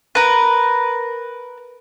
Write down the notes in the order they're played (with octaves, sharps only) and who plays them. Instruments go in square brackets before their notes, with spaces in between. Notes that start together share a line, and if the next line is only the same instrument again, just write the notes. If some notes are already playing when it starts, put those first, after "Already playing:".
[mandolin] A#4 B4